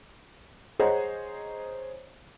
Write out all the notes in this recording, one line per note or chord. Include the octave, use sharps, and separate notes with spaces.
G#4 C5 C#5 D#5 F#5 A#5